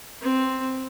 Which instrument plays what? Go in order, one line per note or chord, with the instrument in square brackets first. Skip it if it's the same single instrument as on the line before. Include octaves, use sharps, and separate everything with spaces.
[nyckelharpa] C4